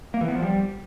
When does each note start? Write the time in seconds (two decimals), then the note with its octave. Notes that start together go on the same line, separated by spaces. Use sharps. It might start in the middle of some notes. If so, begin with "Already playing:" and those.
0.14 A#3
0.21 E3
0.28 B3
0.35 F3
0.42 G3